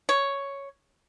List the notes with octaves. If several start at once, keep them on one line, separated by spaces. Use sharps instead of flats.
C#5